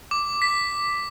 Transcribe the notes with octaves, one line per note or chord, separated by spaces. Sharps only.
D6
B6